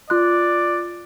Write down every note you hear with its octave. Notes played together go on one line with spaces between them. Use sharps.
F4 D5 C6 F#6